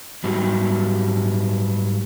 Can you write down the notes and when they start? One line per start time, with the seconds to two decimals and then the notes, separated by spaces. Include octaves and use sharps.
0.24 G#2 F#3 G3